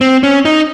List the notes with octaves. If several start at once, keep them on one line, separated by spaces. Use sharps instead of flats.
C4
C#4
D#4